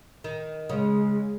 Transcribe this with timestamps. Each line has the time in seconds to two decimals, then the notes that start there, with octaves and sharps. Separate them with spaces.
0.24 D#3
0.70 C#3 G#3